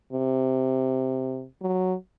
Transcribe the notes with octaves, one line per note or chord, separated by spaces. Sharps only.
C3
F#3